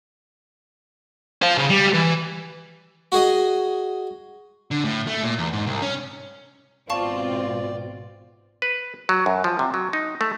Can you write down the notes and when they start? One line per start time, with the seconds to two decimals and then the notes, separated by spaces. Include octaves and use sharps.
1.42 C5 F5
1.58 C#3
1.70 G3
1.93 E3
3.12 F#4 G#4 D#5
4.71 D3
4.85 A2
5.07 A3
5.23 A#2
5.38 E2
5.53 G#2
5.66 C2
5.82 C#4
6.90 G#1 B2 C4 F4 D5 F5 A5 C#6
8.62 B4
9.09 F#3
9.26 F#2
9.44 F3
9.59 C3
9.74 F#3
9.93 D#4
10.21 A3